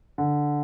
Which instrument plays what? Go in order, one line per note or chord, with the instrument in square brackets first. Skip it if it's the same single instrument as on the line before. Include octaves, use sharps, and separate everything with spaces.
[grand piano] D3